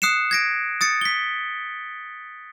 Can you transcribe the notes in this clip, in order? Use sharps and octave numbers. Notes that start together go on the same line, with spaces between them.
D#6 F#6 C7 C#7 E7
G#6 A#6 D7
D#6 A6 C#7
B6 G7